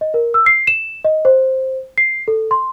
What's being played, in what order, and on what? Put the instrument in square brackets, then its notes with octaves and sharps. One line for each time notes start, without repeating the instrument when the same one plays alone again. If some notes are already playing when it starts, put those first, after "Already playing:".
[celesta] D#5
A#4
E6
C7
E7
D#5
C5
C7
A4
C6